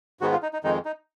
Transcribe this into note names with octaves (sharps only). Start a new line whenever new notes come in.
G#2 D#3 G#3 B3 F#4
F4
D#4
D#4
F2 D#3 G#3 D#4
D#4